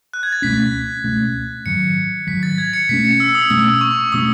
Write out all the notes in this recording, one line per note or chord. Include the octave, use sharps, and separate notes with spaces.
F#6
G#6
A6
C#2 B2 A3 C#4 B6
C#2 B2 A3 C#4
G#2 D#3 F#3 C#7
G#2 D#3 F#3 B6
A6
G#6
C#7
B2 A3 C#4 B6
C#7
E6
D#6
B2 A3 C#4 E6
C#6
B2 A3 C#4 D#6